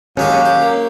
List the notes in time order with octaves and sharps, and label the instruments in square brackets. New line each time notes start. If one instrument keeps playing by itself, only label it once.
[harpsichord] D#2 G#3 G4 [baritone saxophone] F#3 [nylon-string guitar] C#4 [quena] F5
[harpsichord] G4
[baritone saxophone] A#3